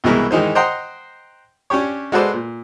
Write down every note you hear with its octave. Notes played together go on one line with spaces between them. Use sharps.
C2 B2 E3 G#3 E4 A#4
D#3 E3 G#3 D#4 C5
C5 D#5 F#5 G5 A#5 C6
C#4 D4 G4 C#5
G#3 F#4 A4 B4 C5 D5
A#2